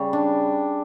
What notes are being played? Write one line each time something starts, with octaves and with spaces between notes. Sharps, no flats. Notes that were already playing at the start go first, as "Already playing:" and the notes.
Already playing: C#3 G3
D4